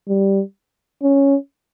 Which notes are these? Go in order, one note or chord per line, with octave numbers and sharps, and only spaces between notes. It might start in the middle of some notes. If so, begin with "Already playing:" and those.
G3
C#4